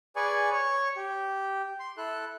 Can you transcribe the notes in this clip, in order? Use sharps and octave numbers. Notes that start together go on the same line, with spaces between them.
G#4 B4 D5 G#5 C#6
C#5 C#6
G4
C6
E4 A4 F#6